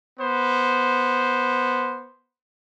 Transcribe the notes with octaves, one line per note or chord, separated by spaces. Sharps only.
B3 C5